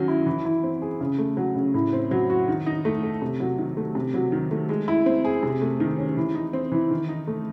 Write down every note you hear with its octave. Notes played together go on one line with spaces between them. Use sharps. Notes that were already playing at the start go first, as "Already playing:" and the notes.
Already playing: D#3 F#3 C#4
E4
E3
E4
C4
G#4
C#3
A3
F#3
C#3
A2
C4
F#3
F#4
D#3
D#4
A3
A4
C3
F#3
D#3
A3
C3
F#3
D#3
A3
G#3
E4
C4
G#4
C3
A3
D#3
C#4
E3
D#4
C4
E3
D#3
D#4
A3